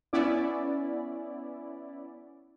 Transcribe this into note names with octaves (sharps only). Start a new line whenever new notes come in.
B3 C#4 E4 D5